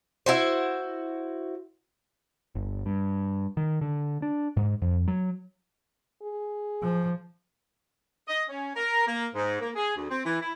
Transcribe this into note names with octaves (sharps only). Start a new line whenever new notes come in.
E4 F#4 C5
G1
G2
D#3
D3
D4
G#2
F2
F#3
G#4
F3
D#5
C#4
A#4
A#3
G#2
A#3
G#4
D2
C4
E3
E4